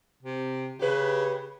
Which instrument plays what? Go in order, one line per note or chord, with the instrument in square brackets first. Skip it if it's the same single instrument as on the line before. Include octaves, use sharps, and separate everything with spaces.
[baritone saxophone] C3
[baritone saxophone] C#3 [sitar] G4 B4